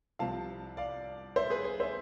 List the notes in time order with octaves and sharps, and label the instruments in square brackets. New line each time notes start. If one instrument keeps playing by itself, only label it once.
[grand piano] C2 C3 F3 F5 A5
D5 F5
C5 E5
G#4 B4
G#4
C5 E5